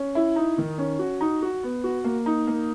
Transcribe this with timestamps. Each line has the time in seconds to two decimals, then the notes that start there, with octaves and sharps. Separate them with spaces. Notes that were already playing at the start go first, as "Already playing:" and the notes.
Already playing: C#4
0.15 E4
0.36 D#4
0.58 D#3
0.78 C#4
0.99 F#4
1.21 D#4
1.42 F#4
1.63 B3
1.84 F#4
2.04 A#3
2.26 D#4
2.47 A#3